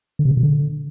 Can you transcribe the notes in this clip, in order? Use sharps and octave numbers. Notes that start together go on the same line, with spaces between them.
D3
C3
C#3
B2
D3